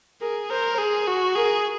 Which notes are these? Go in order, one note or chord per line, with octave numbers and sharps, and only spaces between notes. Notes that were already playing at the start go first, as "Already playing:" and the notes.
G#4 A#4
A#4 C5
G#4
F#4
G#4 A#4